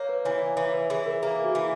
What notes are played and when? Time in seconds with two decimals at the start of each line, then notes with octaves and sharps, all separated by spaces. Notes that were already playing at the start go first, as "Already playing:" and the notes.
Already playing: A#3 C#5
0.09 B4
0.25 E3 C#5
0.57 E3 C#5
0.74 B4
0.90 E3 G#4
1.06 A#4
1.23 A#3 G#4
1.44 F#4
1.55 E3